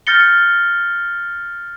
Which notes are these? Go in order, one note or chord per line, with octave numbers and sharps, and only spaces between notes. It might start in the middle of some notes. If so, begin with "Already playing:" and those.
F6 G6 A6 A#6 C#7 G7